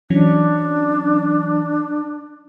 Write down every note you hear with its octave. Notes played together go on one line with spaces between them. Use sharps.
E3 F#3 C#4 D4